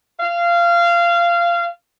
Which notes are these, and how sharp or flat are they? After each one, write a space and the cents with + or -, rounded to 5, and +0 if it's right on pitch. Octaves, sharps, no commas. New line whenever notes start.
F5 -20